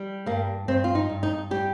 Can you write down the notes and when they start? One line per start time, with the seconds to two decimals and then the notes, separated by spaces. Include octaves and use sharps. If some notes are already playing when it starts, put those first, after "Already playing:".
Already playing: G3
0.26 G2 A#3
0.68 G2 C4
0.84 F4
0.95 D#4
1.09 G2
1.23 D#4
1.51 G3 G4